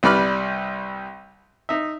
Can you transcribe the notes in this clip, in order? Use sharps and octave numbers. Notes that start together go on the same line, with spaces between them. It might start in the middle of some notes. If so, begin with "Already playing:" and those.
C2 G3 B4 D5 B5 F6
D#4 E5